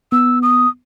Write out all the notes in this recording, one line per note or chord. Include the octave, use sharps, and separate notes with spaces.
B3 E6
D#6